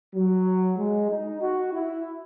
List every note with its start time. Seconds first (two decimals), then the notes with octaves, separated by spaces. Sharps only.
0.15 F#3
0.77 G#3
1.10 D#4
1.41 F#4
1.73 E4